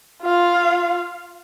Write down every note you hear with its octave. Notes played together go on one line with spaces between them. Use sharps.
F4 F5